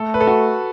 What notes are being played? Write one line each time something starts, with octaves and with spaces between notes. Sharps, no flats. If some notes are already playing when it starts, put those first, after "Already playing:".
Already playing: A3 A4
B4
A4
F#4